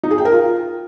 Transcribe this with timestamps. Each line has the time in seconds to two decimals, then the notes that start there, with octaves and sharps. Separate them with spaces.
0.03 D#4
0.11 G#4
0.18 G5
0.25 A#4
0.32 F4